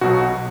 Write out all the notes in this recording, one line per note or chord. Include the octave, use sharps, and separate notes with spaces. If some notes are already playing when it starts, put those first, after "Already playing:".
B1 B2 F#3 F#4